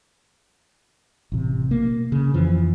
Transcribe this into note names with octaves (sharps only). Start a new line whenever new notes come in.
A1 C3
B2 A#3
C#3
F2 E3 F3